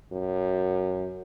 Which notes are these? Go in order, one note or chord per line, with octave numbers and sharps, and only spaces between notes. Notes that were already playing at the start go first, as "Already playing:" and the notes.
F#2